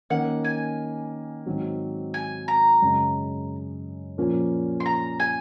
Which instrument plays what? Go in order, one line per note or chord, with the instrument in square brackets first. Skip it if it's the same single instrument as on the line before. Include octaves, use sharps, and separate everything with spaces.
[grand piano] D#3 A#3 C#4 [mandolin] F#5
[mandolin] G#5
[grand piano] G#2 D#3 F#3 C4
[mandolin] G#5
A#5
[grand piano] F#2 C#3 G#3
A#2 F3 A#3 C#4
[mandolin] C6
A#5
G#5